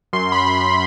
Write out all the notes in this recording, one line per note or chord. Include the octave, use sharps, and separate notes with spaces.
F#2 C6
B5